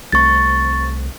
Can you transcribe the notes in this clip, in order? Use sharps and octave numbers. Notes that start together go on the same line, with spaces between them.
C2 A3 C4 C#6 A6